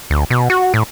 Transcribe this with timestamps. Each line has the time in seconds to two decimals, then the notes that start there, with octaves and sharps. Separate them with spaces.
0.10 D2
0.30 B2
0.50 F#4
0.74 A2